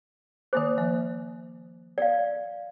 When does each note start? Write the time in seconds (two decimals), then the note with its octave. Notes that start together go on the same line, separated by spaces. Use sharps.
0.53 D#3 A#3 C5 D6
0.77 F3 A#3
1.98 D5 F5